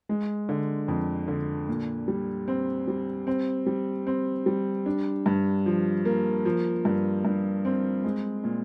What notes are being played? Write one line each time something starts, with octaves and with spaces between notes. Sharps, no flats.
G#3
D3
F2
D3
A#2
G3
C4
G3
C4
G3
C4
G3
D4
G2
F3
A#3
F3
G2
G2
C4
G#3
A#2